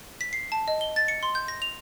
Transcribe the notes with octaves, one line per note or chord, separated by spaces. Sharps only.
B6
C7
A5
D#5
G7
A6
C#7
C6
G6
A#6
F7